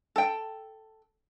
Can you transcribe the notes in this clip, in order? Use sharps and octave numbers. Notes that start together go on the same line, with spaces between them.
A4 G5